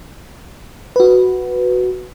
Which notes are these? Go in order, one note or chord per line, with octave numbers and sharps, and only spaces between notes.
F#4 B4